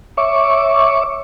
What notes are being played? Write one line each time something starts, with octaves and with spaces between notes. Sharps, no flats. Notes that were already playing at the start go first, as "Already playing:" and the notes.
C#5 E5 C#6 D6